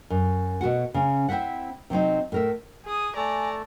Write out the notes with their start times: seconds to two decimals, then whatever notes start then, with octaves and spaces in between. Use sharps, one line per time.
0.10 F#2
0.61 B2 E3 F#4 F#5
0.94 C#3 C#4
1.29 C4 E4 C5 E5 F#5
1.90 C3 F#3 C4 D#4
2.32 A2 A#4 E5
2.86 G#4 D#6
3.16 A3 A4 D5 G#5 A#5